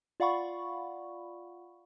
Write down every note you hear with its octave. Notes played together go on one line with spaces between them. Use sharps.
F4 D5 F5 F#5 B5 C#6